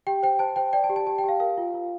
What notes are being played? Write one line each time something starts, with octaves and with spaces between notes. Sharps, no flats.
G4 G5
C5 G5
C5 A5
C5 G5
D5 G5
A5
G4
A5
G4 A5
G5
G4 F5
A#4 F5
F4
F4